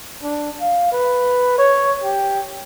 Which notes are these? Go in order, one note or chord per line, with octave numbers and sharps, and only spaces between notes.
D4
F5
B4
C#5
G4